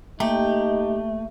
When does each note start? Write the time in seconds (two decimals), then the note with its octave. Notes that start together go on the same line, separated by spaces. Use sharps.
0.20 A3 A#3 D#4 G4